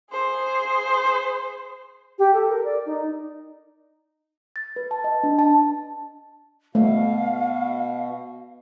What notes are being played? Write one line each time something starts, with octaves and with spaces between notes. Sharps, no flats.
G#4 C5
G4
A4
A#4
D5
D#4
A6
B4
A5
D#5
D4
A5
B2 A3 F5